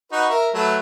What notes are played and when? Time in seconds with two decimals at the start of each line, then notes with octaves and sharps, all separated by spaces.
0.12 D#4 F#4 B4
0.29 A#4 E5
0.54 F#3 A3 B4